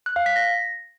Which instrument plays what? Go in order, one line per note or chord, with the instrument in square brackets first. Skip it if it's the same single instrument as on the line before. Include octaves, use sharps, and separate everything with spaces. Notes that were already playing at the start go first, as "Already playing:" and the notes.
[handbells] F#6
F5
B6
A#6